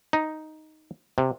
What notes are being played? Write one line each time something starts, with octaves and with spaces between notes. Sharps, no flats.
D#4
C3